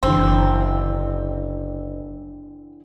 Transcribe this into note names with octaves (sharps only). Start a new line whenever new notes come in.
F#1 D3 E3 C4